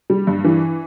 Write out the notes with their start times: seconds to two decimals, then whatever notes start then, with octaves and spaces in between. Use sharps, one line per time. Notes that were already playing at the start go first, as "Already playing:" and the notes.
0.10 G3
0.27 G2
0.44 E3